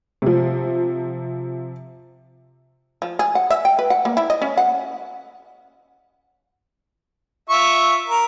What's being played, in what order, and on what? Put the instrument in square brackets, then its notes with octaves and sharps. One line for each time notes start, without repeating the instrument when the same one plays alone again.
[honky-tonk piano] C3 F3
[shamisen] F3
G#4
F#5
E5
G5
B4
F#5
A#3
E4
D#5
C#4
F#5
[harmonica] F4 E5 C#6
A#4